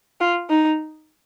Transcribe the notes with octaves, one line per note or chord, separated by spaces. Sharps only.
F4
D#4